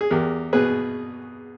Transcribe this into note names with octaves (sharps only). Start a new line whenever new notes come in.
G#4
E2 G4 A#4
B2 G#4 B4